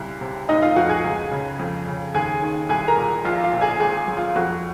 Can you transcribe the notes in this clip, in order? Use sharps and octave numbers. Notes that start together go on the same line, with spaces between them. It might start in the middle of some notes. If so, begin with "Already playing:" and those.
Already playing: C2 C#3
C3
F1 D#4 D#5
F4 F5
F2 F#4 F#5
G#4 G#5
C#2
C#3
F2
C#3
D#2 G#4 G#5
D#3
C2 G#4 G#5
A#4 A#5
A#2
A#1 F4 F5
F4 F5
A#2
G#4 G#5
G#1 G#4 G#5
F#2
F4
F2 F#4